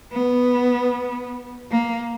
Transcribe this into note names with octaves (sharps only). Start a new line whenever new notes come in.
B3
A#3